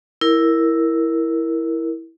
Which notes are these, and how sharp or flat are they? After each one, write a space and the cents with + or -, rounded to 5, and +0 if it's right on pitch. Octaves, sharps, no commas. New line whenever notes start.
E4 +0 A#4 +0